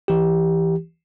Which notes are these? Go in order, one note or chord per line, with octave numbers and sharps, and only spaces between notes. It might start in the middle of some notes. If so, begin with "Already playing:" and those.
E3 G4